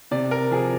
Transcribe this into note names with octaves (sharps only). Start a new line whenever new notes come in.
C3 D5
A#4
F3 G#4